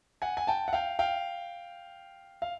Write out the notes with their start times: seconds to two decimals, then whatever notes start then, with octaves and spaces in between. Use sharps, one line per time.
0.22 F#5 G#5
0.37 G#5
0.47 G5 A5
0.68 F#5
0.73 F5 G5
0.99 F5 G5
2.42 F5